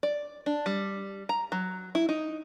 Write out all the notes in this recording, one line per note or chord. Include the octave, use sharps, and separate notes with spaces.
D5
D4
G3
A#5
F#3
E4
D#4